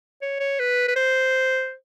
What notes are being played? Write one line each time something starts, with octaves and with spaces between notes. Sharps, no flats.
C#5
C#5
B4
B4
C5